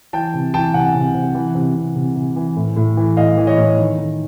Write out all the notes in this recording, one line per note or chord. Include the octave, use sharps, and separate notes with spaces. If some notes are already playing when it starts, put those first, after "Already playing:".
E3 G5 A5
C3
E3 G5 A5
C3 F#5 G#5
C3
C3
E3
C3
C3
C3
C3
E3
A2
A2
E3
A2 D#5 F5
E3
C#5 D#5
A2
D#3
D#3